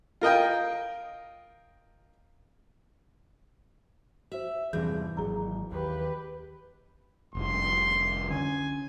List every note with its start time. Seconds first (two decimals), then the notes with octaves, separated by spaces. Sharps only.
0.21 F4 A#4 D#5 G5
4.32 F#4 C5 E5
4.73 E2 G2 C3 E3 G#4 G6
5.17 G#1 F#3 G#4 A#5
5.72 D#2 G4 B4
7.35 F1 C2 C6
8.31 D3 C#4 G#5